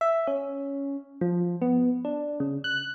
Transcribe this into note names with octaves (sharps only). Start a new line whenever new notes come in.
E5
C#4
F3
B3
D4
C#3
F#6